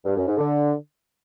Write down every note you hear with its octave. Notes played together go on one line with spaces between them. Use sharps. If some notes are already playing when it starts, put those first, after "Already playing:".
G2
F#2
G#2
D3